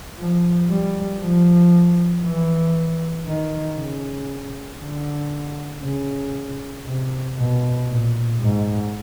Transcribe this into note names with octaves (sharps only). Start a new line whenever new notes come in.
F3
G3
F3
E3
D#3
C#3
D3
C#3
C3
B2
A#2
G#2